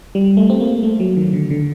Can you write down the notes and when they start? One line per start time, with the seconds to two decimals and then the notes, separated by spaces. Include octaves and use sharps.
0.15 G3
0.37 A3
0.50 C4
0.61 A#3
0.83 A3
1.00 F#3
1.17 D#3
1.33 D3
1.50 D3